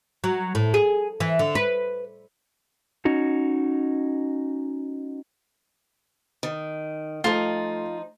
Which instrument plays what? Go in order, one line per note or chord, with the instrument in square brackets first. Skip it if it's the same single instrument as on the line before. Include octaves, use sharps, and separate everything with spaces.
[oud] F#3
A2
G#4
E3
D3
B4
[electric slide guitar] C#4 D#4 F#4
[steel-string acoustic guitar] D#3
[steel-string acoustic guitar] F3 D#4 [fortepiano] A3 [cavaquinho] F4